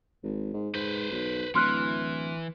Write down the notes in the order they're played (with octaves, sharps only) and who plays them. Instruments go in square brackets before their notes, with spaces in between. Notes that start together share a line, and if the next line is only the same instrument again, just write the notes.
[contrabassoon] G#1
G#2
[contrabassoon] G#2 [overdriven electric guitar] B4 C5
[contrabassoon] B1
[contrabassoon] D1 [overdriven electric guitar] E3 [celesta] C6 F6 F#6